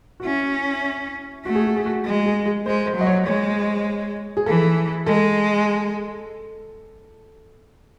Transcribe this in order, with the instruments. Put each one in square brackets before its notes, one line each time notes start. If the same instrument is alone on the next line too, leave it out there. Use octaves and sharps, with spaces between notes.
[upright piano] F#4
[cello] C#4 [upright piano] E4
[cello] A3 [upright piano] F#4
[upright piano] G#4
F#4
G#4
F#4
[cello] G#3 [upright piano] F#4
[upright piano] G#4
G#4
[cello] G#3 [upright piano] C5
[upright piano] C5
[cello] F#3 [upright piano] D#5
[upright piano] C#5
[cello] G#3 [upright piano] C#5
[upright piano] G#4
[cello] E3 [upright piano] A4
[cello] G#3 [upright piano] A4